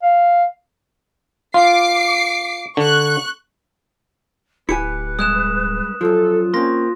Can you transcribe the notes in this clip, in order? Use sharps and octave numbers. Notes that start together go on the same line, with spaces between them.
F5
F4 D6 C7
D3 C#6 F#6
D1 E4 G4 B4 G#5 C#7
G2 G#3 D#6 F#6 E7
F#2 F3 F4 A4
A#3 C4 C#4 C6 A#6